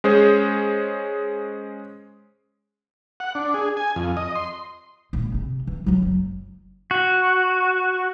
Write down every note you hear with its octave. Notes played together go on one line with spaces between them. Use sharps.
G#3 C#4 G#4 C5
F#5
D4
G#4
G#5
F2
D#5
C6
G#1 A#2
C3
E3
F#3 F4
F#1
F#4